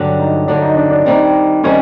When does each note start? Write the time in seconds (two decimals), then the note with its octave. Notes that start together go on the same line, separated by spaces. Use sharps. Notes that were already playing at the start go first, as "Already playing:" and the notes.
Already playing: G2 D3 F#3 D4
0.19 D#4
0.48 G2 D3 F#3 D4
0.62 D#4
0.77 D4
0.91 D4
1.06 D#3 G3 C4 D#4
1.64 D#3 G3 C4 C#4 D#4